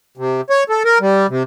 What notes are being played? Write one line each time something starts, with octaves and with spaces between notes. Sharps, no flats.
C3
C#5
A4
A#4
G3
C3